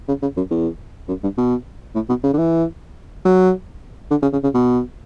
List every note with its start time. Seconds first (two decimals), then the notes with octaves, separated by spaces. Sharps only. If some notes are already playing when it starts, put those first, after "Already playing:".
0.08 C#3
0.22 C#3
0.37 F#2
0.51 E2
1.08 F#2
1.23 G2
1.38 B2
1.95 A2
2.09 B2
2.24 C#3
2.33 D3
2.38 E3
3.25 F#3
4.11 D3
4.22 C#3
4.33 C#3
4.43 C#3
4.54 B2